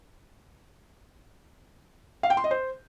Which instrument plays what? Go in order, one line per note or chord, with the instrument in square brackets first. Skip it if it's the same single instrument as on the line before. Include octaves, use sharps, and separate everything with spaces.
[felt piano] F5
G5
C6
D#5
C5